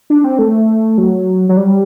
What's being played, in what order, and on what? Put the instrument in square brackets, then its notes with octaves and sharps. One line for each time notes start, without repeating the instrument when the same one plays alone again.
[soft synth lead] D4
C4
A3
F#3
F#3
G3